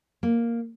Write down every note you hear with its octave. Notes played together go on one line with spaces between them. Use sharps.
A#3